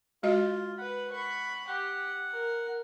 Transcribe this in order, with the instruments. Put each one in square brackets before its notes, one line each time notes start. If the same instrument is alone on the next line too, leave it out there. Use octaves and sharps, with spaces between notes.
[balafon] G#3 F#4 D#5 [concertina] F4
[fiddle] B4 B5 [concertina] F#5
[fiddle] B5 C#6
[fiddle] G4 [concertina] F#5
[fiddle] A#4